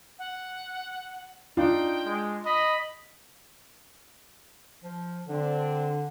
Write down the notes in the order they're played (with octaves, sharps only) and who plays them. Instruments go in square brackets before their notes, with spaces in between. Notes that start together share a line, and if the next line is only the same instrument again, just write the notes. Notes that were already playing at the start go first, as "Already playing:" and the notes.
[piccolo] F#5
[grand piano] D4 F4 [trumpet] D#4 [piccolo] G5
[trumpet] G#3
[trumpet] D#5 [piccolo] B5
[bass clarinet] F3
[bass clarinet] D3 [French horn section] C4 D4